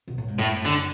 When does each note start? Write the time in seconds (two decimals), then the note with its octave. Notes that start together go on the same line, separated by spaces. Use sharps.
0.08 B2
0.18 A2
0.28 G#2
0.38 F#2 A2
0.65 D3